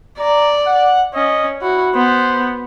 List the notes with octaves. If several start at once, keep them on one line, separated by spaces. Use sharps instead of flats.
D5 A#5
F#5
C#4 D#5
E4 F#4
B3 C5